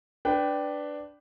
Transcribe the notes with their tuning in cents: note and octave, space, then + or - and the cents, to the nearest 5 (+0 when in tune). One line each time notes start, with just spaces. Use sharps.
D4 +0 B4 +15 G5 -10